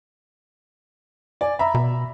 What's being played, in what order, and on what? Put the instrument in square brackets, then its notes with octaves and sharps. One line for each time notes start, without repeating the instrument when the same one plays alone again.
[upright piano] D5 G#5
E5 A#5 B5
[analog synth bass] B2